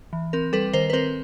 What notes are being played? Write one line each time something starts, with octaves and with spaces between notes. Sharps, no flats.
E3
C4 A#4
G3 A4 B4
D#3 A#4 C5
B4
C4 A#4 C5